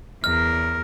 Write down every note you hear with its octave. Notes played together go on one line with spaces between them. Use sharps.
E2 A#4 F6